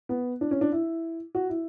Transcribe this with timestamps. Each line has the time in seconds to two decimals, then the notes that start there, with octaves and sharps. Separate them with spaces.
0.09 B3
0.41 D4
0.51 C#4
0.61 D4
0.72 E4
1.35 F#4
1.49 E4